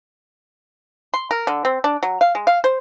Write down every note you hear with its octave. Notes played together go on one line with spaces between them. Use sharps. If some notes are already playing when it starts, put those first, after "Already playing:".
C6
A#4
D3
C4
D4
F#3
F5
G#3
F5
C5